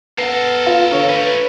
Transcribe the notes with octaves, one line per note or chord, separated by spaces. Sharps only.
B3 A4 A#4 F#5 C7
F4
D3 C#5 F5
A3 C#4 B4